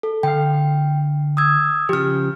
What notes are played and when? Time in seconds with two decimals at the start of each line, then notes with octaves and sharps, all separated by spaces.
0.03 A4
0.23 D3 F5 G5
1.37 D#6 E6 G#6
1.89 C#3 F3 G4 F6